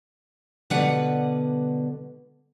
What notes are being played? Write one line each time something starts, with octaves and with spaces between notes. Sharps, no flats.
B2 D3 G3 B4 D5 F#5